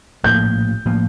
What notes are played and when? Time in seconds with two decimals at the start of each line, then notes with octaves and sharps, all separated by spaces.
0.24 A#1 A2 F3 A#3 G6
0.85 A2 F3 A#3